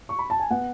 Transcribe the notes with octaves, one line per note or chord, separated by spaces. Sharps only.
C#6
B5
A5
G#5
B3 F#5